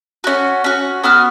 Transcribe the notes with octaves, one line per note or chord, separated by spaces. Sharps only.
C#4 F#4
C#4 F#4
B3 F#4 F6